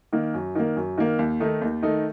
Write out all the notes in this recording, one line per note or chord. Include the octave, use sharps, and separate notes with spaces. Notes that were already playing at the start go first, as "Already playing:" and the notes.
D#3 A#3
F#2
D#3 A#3
F#2
D#3 A#3
D#2
D#3 A3 D#4
D#2
D#3 A3 D#4